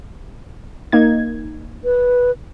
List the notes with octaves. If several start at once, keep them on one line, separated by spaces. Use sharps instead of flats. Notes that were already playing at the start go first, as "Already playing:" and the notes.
A#3 D#4 G#6
B4